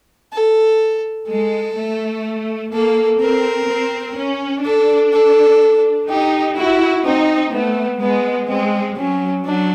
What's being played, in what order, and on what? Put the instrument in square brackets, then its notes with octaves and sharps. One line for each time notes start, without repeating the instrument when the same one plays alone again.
[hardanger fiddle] A4
[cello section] G#3 [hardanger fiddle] A4
[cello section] A3
[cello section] A#3 [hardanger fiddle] A4
[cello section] C4 [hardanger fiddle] A#4
[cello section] C4
C#4
[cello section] D4 [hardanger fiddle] A4
[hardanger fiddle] A4
[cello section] D#4 [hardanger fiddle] G4
[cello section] E4 [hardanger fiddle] F#4
[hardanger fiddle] C4 [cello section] D#4
[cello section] A3 [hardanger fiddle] B3
[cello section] G#3 [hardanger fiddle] B3
[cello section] G#3 [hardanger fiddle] C4
[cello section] F#3 [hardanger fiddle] C#4
[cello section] F#3 [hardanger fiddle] D4